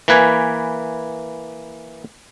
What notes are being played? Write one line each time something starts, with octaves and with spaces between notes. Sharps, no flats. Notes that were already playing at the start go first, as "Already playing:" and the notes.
E3 A#3 B4 G#5